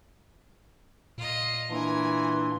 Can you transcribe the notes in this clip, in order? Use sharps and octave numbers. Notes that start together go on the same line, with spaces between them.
A#2 F4 D#5
E3 A#3 D4 A#4 G#5 C6